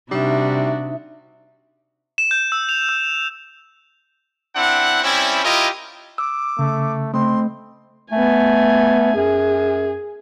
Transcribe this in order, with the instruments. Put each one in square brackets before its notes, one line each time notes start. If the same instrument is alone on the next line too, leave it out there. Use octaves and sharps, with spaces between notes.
[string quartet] C3 [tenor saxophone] G3 [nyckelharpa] D4 F#4 [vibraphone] D#4 E5
[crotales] E7
G6
E6
F7
E6
[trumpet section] C4 D4 E4 F#5
G3 C4 C#4 E4
E4 F4 G4 A#4 D#5
[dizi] D6 [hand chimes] E6
[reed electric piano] C#3 [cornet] A3
[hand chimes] A3 [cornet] C4 [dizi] C6
[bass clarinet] A3 [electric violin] B3 G#5
[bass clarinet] F#2 [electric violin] G#4